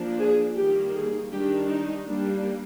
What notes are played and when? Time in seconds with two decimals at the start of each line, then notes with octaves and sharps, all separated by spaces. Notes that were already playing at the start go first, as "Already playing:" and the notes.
Already playing: F3 A#3 D4
0.19 G#4
0.56 D#3 G3 A#3 G4
0.95 G#4
1.31 D#3 G3 D4 G4
1.69 D#4
2.07 G3 A#3 D4